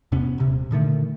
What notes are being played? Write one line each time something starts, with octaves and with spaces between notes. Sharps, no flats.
E2 C3 B3 C#4
D#1 C3
A#2 D3 D#3 A3